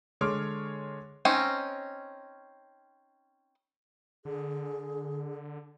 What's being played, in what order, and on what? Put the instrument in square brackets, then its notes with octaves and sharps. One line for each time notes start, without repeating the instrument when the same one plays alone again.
[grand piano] D3 G#3 C#5 C6 D6 F6
[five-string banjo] C4 C#4 D#4
[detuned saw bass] D3 [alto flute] G#4